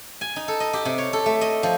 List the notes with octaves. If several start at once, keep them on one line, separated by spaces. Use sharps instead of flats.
G#5
D#4
A4
D#5
G4
C3
C#5
A4
A3
D#5
F3